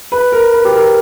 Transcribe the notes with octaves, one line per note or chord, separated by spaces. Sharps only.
B4
A#4
B4
G4
A#4